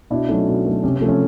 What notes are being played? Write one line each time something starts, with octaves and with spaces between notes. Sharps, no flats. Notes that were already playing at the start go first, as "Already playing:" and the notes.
B2 D4 E4
F#3 A3 C#4 D#4
B2
F#3 A3
C3 C#4
C4
F3 A3
C#4